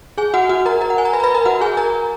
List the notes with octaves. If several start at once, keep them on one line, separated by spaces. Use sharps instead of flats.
G#4 G#5
F#4 F#5
F#4 F#5
A#4 A#5
A#4 A#5
F#5
G#5
A#5
B4 B5
A#5
B4 B5
A#4 A#5
F#4 F#5
G#4 G#5
A#4 A#5